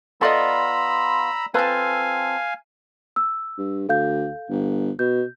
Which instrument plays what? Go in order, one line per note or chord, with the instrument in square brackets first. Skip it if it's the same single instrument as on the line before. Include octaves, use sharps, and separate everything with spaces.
[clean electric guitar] B3 F4 [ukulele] A4 D5 D#5 [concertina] A#5 B5 E6
[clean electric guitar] C4 F4 A4 [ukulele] B4 A5 [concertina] F5 G#5
[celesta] E6
[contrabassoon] G2
[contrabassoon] D2 [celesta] A4 F5 G6
[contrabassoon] G1
[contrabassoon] B2 [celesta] G6